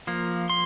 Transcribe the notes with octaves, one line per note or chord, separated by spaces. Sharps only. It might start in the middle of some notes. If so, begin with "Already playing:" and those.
F3 A#3
C6